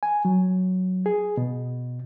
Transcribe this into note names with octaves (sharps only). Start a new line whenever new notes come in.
G#5
F#3
G#4
B2